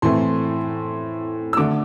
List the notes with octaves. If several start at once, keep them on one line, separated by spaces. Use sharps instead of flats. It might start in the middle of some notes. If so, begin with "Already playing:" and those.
A2 E3 A3 C4 C6
E6
D3 A3 D6